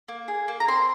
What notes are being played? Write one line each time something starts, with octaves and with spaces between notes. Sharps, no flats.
A#3
G#4
A#3
A#5
C4 C6